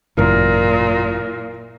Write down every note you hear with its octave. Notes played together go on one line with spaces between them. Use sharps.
G#1 F#2 A#2 C#3 E3 A#4